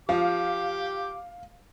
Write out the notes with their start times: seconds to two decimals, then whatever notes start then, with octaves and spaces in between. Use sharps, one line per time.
0.09 F3 G4 F5 D6